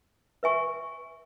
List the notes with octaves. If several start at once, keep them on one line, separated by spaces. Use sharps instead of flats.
B4 E5 G#5 C#6